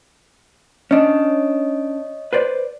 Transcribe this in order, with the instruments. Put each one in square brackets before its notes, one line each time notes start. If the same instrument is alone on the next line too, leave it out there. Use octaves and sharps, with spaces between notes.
[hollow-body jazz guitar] C#4 D4 [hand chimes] C#5 D#5
[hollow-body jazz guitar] B4 C5 D5